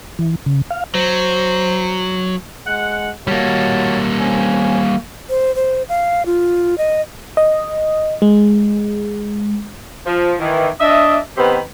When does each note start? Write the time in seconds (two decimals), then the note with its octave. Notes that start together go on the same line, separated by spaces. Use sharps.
0.19 E3
0.46 C#3
0.71 F5
0.95 F#3 C5
2.67 G#3 F#5
3.28 G3 A#3 F#4 C#5 A5
4.18 C4 C#4 G#5
5.30 C5
5.56 C5
5.89 F5
6.26 F4
6.78 D#5
7.37 D#5
8.22 G#3
10.06 F3
10.40 D#3 E3
10.80 D4 D#5 E5
11.37 D#3 B3 C4 G4 B4